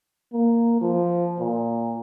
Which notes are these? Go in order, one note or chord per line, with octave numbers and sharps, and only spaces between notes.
A#3
F3
A#2